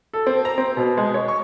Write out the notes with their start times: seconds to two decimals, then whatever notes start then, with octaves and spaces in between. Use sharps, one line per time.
0.13 A4
0.27 C4
0.45 A#5
0.58 C4
0.77 B2
0.97 G#3
1.14 C#5
1.28 C#6